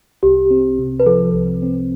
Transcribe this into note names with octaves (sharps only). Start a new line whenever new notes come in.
C2 G4
C4
C3
B4
F3 A4
C2
C4